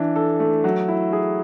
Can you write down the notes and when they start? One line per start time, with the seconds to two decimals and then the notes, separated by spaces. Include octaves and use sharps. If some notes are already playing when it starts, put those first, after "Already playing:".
Already playing: E3 D4
0.16 A4
0.40 A3
0.64 F#3
0.88 E4
1.13 G#4